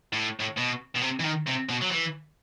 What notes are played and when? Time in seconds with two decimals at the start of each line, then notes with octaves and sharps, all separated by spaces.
0.13 A2
0.40 A2
0.58 B2
0.96 B2
1.02 C3
1.20 E3
1.24 D#3
1.47 C3
1.69 B2
1.82 F#3
1.91 E3